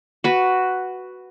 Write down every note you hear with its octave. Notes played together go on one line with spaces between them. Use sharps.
F#4 B4